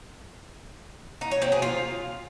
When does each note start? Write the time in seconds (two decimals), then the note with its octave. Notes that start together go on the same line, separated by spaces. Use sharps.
1.21 D#4
1.31 C#5
1.42 C4
1.52 G#4
1.62 F4